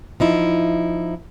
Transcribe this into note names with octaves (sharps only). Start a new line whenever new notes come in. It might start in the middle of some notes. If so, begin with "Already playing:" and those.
F3 D#4 E4